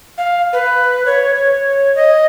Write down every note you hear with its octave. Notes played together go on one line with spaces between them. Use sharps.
F5
B4
C#5
C#5
D#5